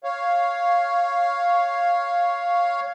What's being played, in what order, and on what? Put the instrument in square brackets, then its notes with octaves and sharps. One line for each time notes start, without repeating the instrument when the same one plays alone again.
[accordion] C#5 F5